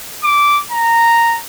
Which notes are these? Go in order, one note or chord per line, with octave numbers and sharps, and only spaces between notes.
D6
A#5